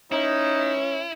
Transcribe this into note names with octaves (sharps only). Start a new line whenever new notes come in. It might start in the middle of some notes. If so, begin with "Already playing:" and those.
C#4 D#4 E4